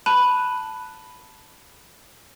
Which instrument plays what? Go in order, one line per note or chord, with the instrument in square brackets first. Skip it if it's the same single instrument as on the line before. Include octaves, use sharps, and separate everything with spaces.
[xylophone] A5 B5 F#6 D#7